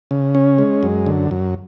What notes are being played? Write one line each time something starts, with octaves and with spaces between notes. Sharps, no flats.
C#3
C#4
G#3
F#2
D3
F#2